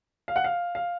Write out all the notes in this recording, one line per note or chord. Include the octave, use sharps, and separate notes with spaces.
F5
F#5
F5
F5